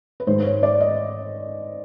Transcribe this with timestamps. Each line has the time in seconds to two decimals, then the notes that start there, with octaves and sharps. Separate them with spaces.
0.20 B4
0.27 G#2 D#3 G#3 C5
0.45 C#5
0.63 D5
0.81 D#5